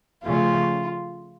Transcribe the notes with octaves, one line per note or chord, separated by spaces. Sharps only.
C#3 F3 A3 C#4 F4